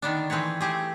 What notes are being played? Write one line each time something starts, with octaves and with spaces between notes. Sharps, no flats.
D3 D#3 B3 D4
E3 C4 G#4 B4 C#5
A3 C4 G4 G#4